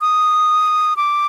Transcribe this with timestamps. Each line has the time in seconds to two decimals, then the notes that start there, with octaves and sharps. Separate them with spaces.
0.01 D#6
0.97 D6